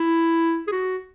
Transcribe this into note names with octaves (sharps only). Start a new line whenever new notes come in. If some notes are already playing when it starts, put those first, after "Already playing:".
Already playing: E4
G#4
F#4